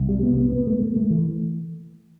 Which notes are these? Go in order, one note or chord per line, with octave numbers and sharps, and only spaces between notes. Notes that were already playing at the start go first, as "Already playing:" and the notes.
Already playing: C2
G3
B3
B3
B3
A3
A3
A3
E3